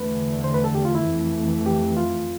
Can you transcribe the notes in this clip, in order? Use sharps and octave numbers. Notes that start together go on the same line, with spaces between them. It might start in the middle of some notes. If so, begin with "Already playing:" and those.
Already playing: E2 D3 A3 B4
C5
B4
A4
G4
F4
E4
F2 E3 A3
G4
F4